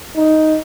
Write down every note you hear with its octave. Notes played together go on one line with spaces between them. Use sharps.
D#4